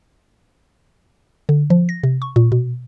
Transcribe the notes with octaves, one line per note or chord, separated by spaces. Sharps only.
D3
F3
A#6
C3
C#6
A#2
B2